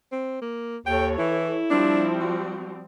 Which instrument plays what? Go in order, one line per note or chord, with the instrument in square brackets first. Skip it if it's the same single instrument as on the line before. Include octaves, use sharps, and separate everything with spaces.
[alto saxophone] C4
A#3
[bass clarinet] D#2 [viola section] A4 C#5 [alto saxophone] G5
[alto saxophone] E3 [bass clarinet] E4
[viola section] F3 G3 C4 [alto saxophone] D4
[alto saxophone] F#4